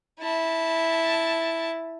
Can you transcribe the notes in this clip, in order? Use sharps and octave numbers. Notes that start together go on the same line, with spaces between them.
E4 A5